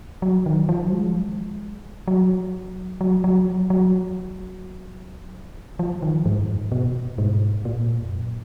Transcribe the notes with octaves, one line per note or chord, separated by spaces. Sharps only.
F#3
D#3
F3
F#3
G#3
F#3
F#3
F#3
F#3
F3
D#3
G#2
F#2
G#2
B2
G#2
A#2
F2
F#2